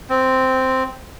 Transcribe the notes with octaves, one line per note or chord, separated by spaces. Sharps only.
C4